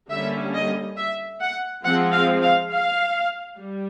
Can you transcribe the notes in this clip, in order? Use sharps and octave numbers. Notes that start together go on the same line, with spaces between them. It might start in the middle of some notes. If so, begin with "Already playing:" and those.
D3 G3 A#3 C#4 E5
D#5
E5
F#5
F3 G#3 C4 F#5
F5
F5
F5
G3